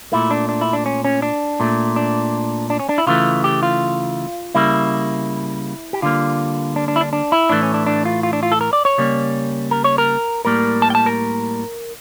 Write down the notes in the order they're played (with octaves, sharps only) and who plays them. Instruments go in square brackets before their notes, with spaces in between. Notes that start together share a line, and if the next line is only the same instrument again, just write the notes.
[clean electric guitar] A#2 A3 E4
D4
D4
E4
D4
C#4
C#4
D4
A#2 A3
D4
D4
C#4
D4
E4
C#3 E3 A3 F4
G4
F4
C#3 G3 A#3 E4
G4
D3 G3 A#3 F4
D4
D4
E4
D4
D4
E4
A2 E3 A3 D4
C#4
D4
D4
F4
F4
D4
F4
A4
A#4
D5
C#5
C#3 G3 A#3
A#4
C#5
A#4
A2 G3 A#3 A#4
A5
G5
A5
A#4